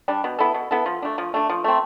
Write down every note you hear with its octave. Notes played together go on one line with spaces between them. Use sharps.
G3 D4
B2
B3 E4 A4
B2
B3 E4 A4
F3
A3 D4
F3
A3 D4
F3
A3 C4